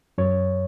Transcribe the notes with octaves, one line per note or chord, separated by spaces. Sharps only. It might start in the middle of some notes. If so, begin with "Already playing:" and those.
F#2 C#5